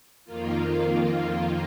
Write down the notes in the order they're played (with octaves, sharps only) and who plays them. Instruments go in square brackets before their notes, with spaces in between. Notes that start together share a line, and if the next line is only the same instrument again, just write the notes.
[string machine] F2 D#3 A#3 F4